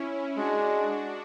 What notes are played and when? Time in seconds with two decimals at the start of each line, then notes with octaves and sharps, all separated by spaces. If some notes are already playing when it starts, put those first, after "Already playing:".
Already playing: C#4 E4
0.37 G#3 D4 F#4